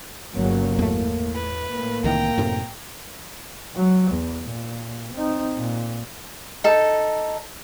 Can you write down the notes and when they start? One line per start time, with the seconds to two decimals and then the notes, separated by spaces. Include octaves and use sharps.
0.34 G1 C#3 F#3 A#3
0.79 E2 A2 A3
1.34 B4
1.70 A2 A#3
2.04 C2 D#3 E3 G5 A#5
2.38 F#2 A2 C3
3.76 F#3
4.12 E2
4.44 A#2
5.14 C4 D#4
5.57 A#2
6.64 D#4 A4